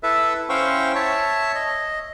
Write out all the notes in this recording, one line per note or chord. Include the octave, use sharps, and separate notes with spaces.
E4 A4 B4 E5
C#4 E4 C5 F5 G5 C#6
C#5 E5 A5
D#5